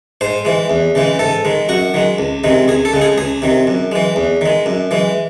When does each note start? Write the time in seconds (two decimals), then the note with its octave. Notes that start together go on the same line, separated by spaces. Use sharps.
0.21 G#2 C5
0.45 E3 G#3
0.70 E2
0.95 C#3 E3 G#3
1.19 G#2 A4
1.45 D#3 G#3
1.69 F#2 F#4
1.94 D#3 G#3
2.18 C#2
2.44 C3 D#3 G#3
2.68 C#2 G#4
2.85 A4
2.93 C#3 G#3
3.02 G#4
3.18 C#2 G#4
3.42 C3 D#3
3.67 F#2
3.92 E3 G#3
4.16 E2
4.41 D#3 G#3
4.66 F#2
4.91 E3 G#3